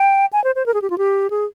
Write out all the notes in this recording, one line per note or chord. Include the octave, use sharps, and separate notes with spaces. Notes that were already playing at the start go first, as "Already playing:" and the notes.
Already playing: G5
G#5
C5
C5
A#4
G#4
G4
F4
G4
G#4